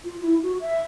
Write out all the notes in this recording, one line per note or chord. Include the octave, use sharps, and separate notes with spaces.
F4
E4
F#4
E5